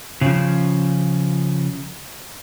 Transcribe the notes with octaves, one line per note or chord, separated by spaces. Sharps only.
C#3 F3